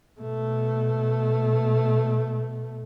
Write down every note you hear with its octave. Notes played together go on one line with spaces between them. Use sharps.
B2 A3